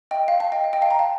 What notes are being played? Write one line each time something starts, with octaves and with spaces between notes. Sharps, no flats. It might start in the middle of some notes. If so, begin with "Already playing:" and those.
D#5 G5
F5
F5 A5
D#5 G5
F5
D#5 G5
F5 A5
G5 A#5
F5 A5